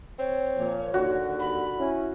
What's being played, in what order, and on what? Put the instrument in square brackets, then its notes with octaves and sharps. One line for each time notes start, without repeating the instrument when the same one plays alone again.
[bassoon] C4 [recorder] C#5
[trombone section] A#2 F3
[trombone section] D#2 [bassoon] D3 [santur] F#4
[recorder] B5
[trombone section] C#4 E4